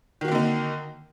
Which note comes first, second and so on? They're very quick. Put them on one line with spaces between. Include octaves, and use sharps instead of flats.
D#3 F#4 A#3 D3 D#4